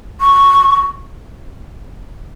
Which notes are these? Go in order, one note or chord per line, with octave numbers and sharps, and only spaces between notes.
C#6